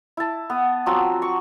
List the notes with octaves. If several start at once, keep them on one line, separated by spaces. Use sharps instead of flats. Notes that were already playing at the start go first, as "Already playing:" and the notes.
E4 A5
B3 D#6
F3 F#3 C4 F#4
C#6